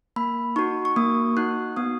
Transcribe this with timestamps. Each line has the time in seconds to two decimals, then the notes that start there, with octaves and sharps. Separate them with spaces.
0.16 A#3 B5
0.56 D#4 F#4 C#6
0.85 C#6
0.96 A#3 D#6
1.37 D#4 F#4 F#6
1.76 B3 D#6